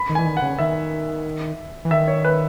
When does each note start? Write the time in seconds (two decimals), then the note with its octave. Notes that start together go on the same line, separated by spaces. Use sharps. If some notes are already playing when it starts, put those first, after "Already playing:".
Already playing: B5
0.09 D#3
0.15 E3 G#5
0.26 D#3
0.37 F#5
0.42 C#3
0.59 D#3 E5
1.85 E3
1.91 D#3 E5
2.08 C#5
2.25 B4